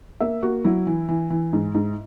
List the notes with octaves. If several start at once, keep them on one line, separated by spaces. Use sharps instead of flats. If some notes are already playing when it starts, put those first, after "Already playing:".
A#3 E5
A#3 F#4
F#3 E4
E3
E3
E3
G#2
G#2